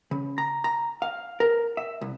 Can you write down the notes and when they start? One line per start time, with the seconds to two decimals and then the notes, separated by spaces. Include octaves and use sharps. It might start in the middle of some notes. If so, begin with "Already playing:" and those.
0.11 C#3
0.38 A#5
0.64 A#5
1.02 F5
1.40 A#4
1.77 E5
2.01 C2